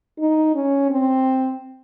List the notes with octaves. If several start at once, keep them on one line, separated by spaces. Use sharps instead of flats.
D#4
C#4
C4